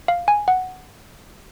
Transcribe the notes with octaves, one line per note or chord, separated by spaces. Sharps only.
F5
G#5
F#5